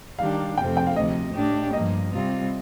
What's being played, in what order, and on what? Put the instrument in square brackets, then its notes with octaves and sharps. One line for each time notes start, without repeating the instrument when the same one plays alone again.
[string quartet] D#3 G3 D4 G4 [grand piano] F5
[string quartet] F2 C3 F3 A3 C4 [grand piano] G5
[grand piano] G5
F5
[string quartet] D2 C3 F3 [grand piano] D#5
[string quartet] A2 A3 D4 G4
[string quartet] G2 F3 A#3 [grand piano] D#5
[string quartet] C3 G3 C4 F4